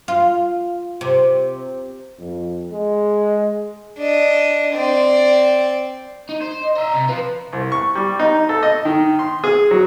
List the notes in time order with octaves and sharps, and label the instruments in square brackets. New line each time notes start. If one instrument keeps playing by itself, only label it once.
[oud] F4
C3
[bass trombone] F2
G#3
[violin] D4 D#5
C4 D5
[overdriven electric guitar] D#4
C5
[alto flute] D#5
[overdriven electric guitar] D#5 E5 [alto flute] A#5
[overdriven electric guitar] C3
[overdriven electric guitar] F4 C5 [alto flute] B4
[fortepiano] C2
C#6
G3
D#4
A4
D#5
D#3
C6
G#4
F#3